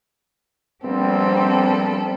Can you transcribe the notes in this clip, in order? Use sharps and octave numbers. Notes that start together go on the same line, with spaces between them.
A#1 G3 B3 C4 A4